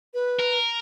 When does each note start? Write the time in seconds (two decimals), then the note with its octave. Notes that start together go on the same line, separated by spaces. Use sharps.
0.14 B4
0.39 A#4